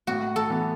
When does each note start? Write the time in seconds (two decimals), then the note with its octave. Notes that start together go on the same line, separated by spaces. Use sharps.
0.07 A2 F#4
0.36 A4
0.50 E3 B3